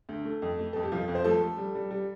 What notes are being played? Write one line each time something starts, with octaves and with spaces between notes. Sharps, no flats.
D2
A3
F2
A3
F2 A4
G4
F2 F3 F4
F2
C5
F3 A3 A4
A3
G3
G3
G3